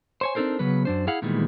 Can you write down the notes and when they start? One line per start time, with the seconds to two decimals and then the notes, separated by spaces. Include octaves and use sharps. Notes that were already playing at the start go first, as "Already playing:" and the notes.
0.21 C5 C#5 G#5
0.35 C4 D4 D#4 A4 A#4 C5
0.59 C#3 F#3 B3 B4
0.85 F#2 D4 C5
1.07 E4 G#4 F5 F#5
1.22 A#2 D#3 E3 G3 G#3 B3